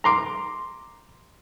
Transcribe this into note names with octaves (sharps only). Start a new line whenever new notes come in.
A#5 C6 D6